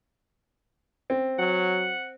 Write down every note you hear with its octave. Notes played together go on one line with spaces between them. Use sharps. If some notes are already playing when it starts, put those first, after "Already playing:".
C4
F#3 F#5